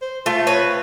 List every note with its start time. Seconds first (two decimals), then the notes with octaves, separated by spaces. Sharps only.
0.02 C5
0.26 A3 F4
0.47 C4 B4 C#5